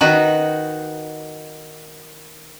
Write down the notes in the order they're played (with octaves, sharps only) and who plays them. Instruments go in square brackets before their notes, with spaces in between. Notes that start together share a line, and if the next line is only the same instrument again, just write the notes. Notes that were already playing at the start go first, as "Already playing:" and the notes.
[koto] D#3 D#4 F#4 B4